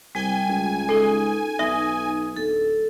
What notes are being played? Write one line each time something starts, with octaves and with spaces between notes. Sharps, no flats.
C2 G3 G5 G#5
C#2
G#3 D#4 A4
B1 D#4 E5
D1 A4